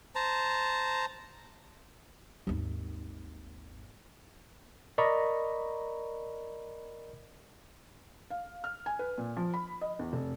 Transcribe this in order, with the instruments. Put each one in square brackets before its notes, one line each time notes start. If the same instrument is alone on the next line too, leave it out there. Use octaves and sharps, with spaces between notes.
[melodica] C5 A5 A#5
[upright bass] G#1 D#2
[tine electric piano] A#4 D5 D#5 A#5 B5 C#6
[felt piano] F5
F6
G#5
B4
A#2
F3
B5
D#5
E2
F1